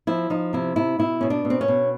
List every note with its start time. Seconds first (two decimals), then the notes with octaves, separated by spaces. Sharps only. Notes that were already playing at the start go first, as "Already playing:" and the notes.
0.07 F3 E4
0.30 F3 D#4
0.53 C3 E4
0.76 C3 E4
0.99 B2 E4
1.21 B2 C#4
1.30 D4
1.45 B2
1.50 C4
1.61 C#4
1.68 B2